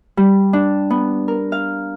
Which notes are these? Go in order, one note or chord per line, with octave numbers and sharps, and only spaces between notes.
G3
D4
B3
A#4
F5